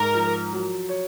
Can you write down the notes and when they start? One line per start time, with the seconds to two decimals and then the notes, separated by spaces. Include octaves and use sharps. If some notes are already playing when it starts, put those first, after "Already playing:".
Already playing: G#2 A#4
0.14 F3
0.53 F#3
0.89 C#5